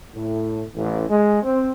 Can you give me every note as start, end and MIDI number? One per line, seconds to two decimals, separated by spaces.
0.14 0.63 45
0.75 1.05 33
1.09 1.41 56
1.43 1.71 60